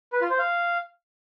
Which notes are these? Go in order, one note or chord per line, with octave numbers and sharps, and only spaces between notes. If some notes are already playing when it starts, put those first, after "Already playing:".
B4
F4
C5
F5